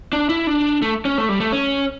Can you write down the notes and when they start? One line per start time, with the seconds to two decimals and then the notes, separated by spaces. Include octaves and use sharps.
0.13 D4
0.29 E4
0.47 D4
0.82 A3
1.05 C#4
1.18 A3
1.29 G3
1.40 A3
1.52 C#4